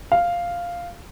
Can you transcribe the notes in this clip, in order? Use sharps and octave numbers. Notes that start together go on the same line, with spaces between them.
F5